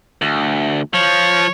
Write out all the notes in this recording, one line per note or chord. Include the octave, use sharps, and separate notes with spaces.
D2
F3 C#5